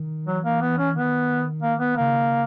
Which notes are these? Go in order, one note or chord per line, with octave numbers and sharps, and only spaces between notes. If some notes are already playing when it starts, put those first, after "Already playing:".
Already playing: D#3
E3 F#3
A#3
B3
C#4
D#3 B3
A#3
B3
C#3 A#3